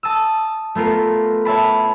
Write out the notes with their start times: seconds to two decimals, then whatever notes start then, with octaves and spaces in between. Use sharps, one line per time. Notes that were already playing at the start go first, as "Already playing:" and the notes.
0.03 A5 D#6 E6
0.75 A3 B3 F4 A#4
1.45 C#5 E5 A5 B5